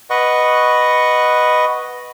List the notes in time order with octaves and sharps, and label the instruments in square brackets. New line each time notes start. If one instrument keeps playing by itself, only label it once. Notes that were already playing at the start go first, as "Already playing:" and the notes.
[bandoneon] B4 D#5 F#5 C#6